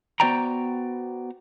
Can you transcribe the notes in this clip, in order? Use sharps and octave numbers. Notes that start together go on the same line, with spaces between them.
B3 F#4 C5 D5 G5 A#5